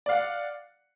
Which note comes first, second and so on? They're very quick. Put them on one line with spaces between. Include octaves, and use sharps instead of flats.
D5 F5 F#5